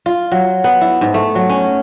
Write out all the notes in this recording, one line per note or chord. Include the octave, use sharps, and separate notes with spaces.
F4
F#3
B3
E4
G#2
A3
F#3
C#4